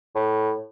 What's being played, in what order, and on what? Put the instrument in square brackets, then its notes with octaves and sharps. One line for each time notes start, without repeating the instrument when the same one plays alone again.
[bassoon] A2